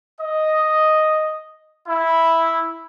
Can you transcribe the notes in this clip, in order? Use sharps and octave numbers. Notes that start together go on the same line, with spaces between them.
D#5
E4